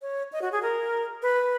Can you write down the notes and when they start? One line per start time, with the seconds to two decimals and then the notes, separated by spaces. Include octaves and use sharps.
0.02 C#5
0.32 D#5
0.42 F#4
0.52 G#4
0.62 A#4
1.22 B4